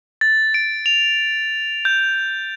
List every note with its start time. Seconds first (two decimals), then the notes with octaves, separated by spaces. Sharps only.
0.21 A6
0.54 D7
0.86 F7
1.85 G6